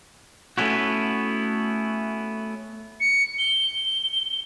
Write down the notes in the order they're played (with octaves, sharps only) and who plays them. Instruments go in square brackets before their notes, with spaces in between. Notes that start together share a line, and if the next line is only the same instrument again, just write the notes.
[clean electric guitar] A3 B3 C#4 E4 F#4
[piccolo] C#7
G7